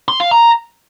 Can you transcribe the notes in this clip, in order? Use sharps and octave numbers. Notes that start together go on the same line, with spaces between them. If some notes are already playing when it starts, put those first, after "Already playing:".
C6
F5
A#5